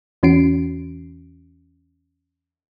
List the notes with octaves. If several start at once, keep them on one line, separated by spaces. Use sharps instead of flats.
E2 E3 C#4 F#4 C7 D7